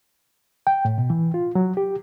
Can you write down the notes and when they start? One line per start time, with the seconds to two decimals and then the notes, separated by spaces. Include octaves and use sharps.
0.67 G5
0.85 A2
0.98 B2
1.10 E3
1.34 F4
1.55 F#3
1.77 G4